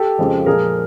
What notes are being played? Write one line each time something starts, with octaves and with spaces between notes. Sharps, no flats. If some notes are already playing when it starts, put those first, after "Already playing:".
Already playing: G4 A4
F2 C#3 F3 G#3
A#2 F3 G#3 G#4 A#4